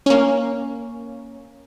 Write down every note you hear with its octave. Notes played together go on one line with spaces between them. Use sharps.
A#3 C#4